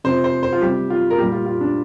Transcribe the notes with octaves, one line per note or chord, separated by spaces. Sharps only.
C3 F3 C5
C5
C5
F4
C3 G3 G4
F4
A#4
A#2 G3 G4
F4
F4
D4